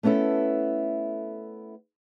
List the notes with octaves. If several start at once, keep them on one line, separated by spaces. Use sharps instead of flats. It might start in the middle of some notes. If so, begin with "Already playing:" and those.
A3 B3 C#4 E4 A4